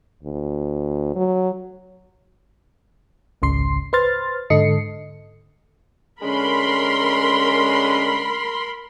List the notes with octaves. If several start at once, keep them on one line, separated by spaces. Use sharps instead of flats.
D2
F#3
G#1 C#2 C#3 C6 C7
B4 C5 C6 F6 A6
G#2 D3 A4 D#5 C7 C#7
D3 G#3 C#4 A#4 B5 C6